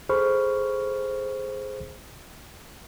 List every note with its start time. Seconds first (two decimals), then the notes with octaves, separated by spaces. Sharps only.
0.09 G#4 A4 C5 B5 C#6 F6